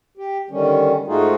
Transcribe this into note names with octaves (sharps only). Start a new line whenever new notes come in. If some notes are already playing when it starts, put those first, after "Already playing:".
G4
D3 D#3 G3 C#4
G#2 A3 D#4 F4 F#4 G#4